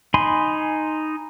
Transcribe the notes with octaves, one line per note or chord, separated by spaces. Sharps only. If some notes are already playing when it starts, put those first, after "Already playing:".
D#4 G#5 B5 C6